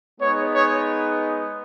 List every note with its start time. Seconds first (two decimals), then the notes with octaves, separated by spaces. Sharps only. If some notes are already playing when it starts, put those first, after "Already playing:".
0.19 G#3 B3 D#4 C#5
0.51 C#5